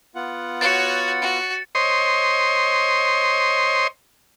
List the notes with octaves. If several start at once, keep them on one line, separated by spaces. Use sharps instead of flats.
B3 F4 F#5
F#4 C#5 A6 C#7
F#4
C5 C#5 D#5 C6